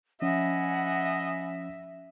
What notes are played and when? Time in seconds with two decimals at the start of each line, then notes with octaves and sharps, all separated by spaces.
0.22 F3 C#4 D#5 E5 F#5 G#5 B5